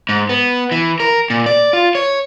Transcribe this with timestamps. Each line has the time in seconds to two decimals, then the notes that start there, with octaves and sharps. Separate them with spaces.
0.09 G#2
0.29 B3
0.71 E3
1.00 A#4
1.30 A#2
1.46 D5
1.73 F4
1.95 C#5